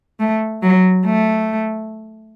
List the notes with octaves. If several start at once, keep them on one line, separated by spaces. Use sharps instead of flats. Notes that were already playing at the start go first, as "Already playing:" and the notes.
A3
F#3
A3